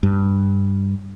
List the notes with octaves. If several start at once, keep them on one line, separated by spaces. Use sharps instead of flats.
G2